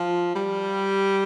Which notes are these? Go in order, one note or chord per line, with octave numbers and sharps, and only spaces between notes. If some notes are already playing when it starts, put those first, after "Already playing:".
Already playing: F3
G3